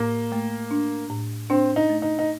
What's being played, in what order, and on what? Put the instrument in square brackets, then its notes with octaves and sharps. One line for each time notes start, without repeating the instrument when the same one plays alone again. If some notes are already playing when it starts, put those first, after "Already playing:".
Already playing: [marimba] A2 [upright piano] A#3
[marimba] A3
D4
A2
[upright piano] C4 [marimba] D4
[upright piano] D#4
[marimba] A3
[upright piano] D#4
D#4